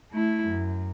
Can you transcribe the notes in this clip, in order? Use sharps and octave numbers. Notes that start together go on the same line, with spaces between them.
A3 E4
F#2